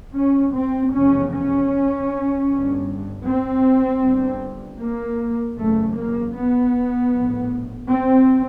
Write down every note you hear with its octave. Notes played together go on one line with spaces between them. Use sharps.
C#4
C4
F1 E2 C#3 C#4
C#4
G1 G2
C4
G1 G2
A#3
F#1 E2 C#3 A3
A#3
B3
A#1 A2
C4